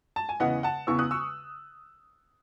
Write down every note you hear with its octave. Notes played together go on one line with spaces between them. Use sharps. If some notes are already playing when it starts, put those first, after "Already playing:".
A5
G#5
E2 C#3 E3 B3 D#5 F#5
F#5 A5
E2 C#3 E3 B3 C#6 E6
D#6 F#6
C#6 E6